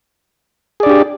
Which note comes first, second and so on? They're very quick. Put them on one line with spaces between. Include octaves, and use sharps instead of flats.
G#4 D5 D4 G4